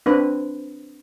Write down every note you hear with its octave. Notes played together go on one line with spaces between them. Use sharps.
C4 D4 B4